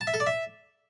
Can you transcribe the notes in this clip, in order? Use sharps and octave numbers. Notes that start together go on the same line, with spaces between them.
A5
E5
A4
D5
E5